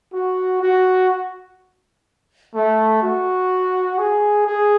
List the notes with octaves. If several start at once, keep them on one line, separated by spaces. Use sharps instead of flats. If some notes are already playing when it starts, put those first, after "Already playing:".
F#4
F#4
A3
F#4
G#4
G#4